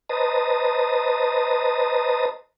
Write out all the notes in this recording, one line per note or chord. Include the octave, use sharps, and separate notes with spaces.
B4 C5 D#5 A5 A#5 D#6